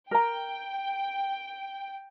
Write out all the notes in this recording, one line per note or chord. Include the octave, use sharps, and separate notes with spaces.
A#4 G5 A#5